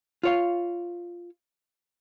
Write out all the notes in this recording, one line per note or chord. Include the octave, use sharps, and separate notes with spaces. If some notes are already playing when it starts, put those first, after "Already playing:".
F4 C#5 F5